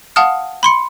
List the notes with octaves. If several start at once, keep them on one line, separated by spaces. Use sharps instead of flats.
F5 F#5 A5 D#6 F6
B5 C6 C#7